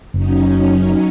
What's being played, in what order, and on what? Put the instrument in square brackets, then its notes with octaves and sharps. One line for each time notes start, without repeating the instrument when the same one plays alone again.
[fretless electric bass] F#1 [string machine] F#3 C#4 D#4